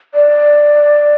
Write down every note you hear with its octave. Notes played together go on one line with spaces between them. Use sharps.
D5